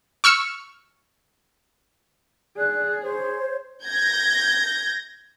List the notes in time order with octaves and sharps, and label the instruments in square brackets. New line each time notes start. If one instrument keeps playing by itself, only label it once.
[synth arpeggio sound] C#6 E6 F6 C#7
[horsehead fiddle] G#4 [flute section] D5 F#6
[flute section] C5 C#5
[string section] G6 G#6 A#6